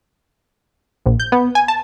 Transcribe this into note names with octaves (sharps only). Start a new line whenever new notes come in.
A#1
G6
B3
G#5
A5